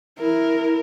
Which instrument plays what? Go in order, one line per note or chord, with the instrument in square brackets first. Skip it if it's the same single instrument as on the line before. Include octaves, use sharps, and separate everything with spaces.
[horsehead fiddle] E4 [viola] A#4